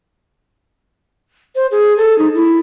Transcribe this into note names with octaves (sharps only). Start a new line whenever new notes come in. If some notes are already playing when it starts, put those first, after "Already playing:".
C5
G#4
A4
D#4
E4